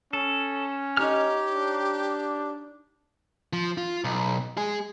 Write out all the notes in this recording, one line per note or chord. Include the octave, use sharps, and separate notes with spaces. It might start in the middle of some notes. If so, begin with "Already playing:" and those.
C#4 A4
D#4 G4 C#5 A5 F6
D4
F3
F4
B1
G#3 G#4